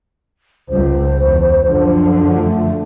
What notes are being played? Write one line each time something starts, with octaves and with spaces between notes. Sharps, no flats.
C#2 C5
E2
F#2 D3 F3
A3